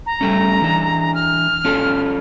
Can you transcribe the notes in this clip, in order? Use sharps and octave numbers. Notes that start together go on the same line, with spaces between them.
A#5
G3 A3 C#4
E3 D4
F6
C#4 F4 A4